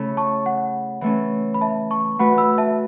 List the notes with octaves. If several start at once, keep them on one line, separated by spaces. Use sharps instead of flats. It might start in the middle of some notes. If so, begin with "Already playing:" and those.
Already playing: C#3 A3 C#4 E4 A4
A5 C#6
F#5
E3 A3 C#4
B5
E5 A5
A5 C#6
A3 F#4 B4 F#5 B5
B5 E6
E5 A5